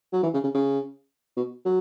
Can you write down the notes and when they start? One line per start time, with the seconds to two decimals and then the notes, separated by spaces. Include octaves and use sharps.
0.13 F#3
0.23 E3
0.34 C#3
0.44 C#3
0.54 C#3
1.37 B2
1.65 F#3